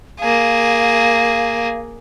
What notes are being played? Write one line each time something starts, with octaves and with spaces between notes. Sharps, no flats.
A#3 G#4 F5